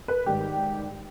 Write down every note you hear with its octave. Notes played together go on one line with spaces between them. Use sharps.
B4
G#2 D#3 G3 G4